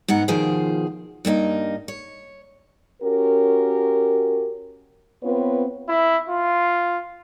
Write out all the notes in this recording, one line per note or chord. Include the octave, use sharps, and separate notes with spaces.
G#2 B3 F#5 A#5
B2 D#3 F3 F4 G#4 C5
G2 A#3 D4 D#4
C#5
C#4 F#4 G4 A#4
B3 C4 F4 B4 C#5
E4
F4